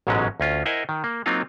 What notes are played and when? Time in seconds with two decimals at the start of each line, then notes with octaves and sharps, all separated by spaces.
0.07 A1 G#2 B2 F#3 G#3 C#4
0.40 D2 C#4 F4
0.66 E4 A#4 C5 D#5 F#5 G#5
0.89 D#3
1.04 A#3
1.26 F#3 A#3 C4 D#4 F4 F5